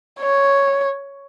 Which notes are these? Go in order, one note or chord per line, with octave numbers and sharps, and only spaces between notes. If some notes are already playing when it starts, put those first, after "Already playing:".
C#5